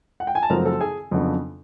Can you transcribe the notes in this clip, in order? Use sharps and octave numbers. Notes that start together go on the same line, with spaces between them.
F#5
G5
G#5
A5
F#2 C#3 F3 A3 C4 A#4 A#5
A4 A5
G#4 G#5
F2 C#3 F#3 B3 D4